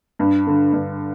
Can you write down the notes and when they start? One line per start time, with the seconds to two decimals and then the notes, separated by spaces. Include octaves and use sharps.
0.19 G2
0.47 D3
0.73 G2